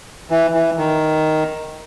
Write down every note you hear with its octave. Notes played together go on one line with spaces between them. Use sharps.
E3
E3
D#3